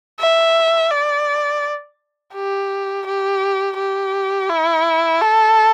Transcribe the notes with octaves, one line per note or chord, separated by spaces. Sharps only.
E5
D5
G4
G4
G4
E4
A4